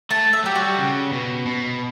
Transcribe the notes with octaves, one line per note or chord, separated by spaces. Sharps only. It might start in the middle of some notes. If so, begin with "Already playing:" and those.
A3 A5
E5
F#3 G4
F#4
G3
C#3
B2
B2